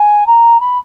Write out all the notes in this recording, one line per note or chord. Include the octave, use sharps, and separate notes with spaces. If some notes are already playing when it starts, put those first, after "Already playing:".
Already playing: G#5
A#5
B5